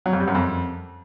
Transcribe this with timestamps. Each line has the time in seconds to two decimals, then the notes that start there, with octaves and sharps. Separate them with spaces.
0.06 F#3
0.13 F2
0.20 G3
0.27 F#2
0.35 F2